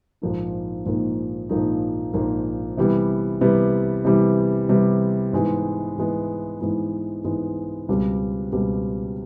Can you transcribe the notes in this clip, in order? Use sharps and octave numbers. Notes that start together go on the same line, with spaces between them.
A#1 G#2 F3 A#3 D#4
A#1 G#2 F3 A#3 D#4
A#1 G#2 F3 A#3 D#4
A#1 G#2 F3 A#3 D#4
C3 E3 G3 B3
C3 E3 G3 B3
C3 E3 G3 B3
C3 E3 G3 B3
G#2 E3 G#3 B3
G#2 E3 G#3 B3
G#2 E3 G#3 B3
G#2 E3 G#3 B3
C#2 B2 G3 C4
C#2 B2 G3 C4